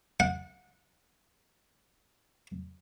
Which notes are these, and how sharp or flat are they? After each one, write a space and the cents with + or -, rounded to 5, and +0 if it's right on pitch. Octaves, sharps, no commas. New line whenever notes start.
F#5 -25